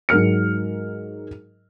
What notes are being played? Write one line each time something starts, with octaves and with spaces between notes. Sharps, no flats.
G#2 F#3 A#4 F6 C#7